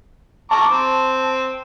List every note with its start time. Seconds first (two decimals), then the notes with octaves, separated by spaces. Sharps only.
0.51 A5 A#5 C#6 D6
0.71 C4